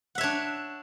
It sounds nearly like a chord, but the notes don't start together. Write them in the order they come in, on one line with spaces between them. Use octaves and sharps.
F#5 E5 C#5 D4